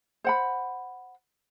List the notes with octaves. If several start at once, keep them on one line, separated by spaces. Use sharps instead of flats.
C5 F#5 B5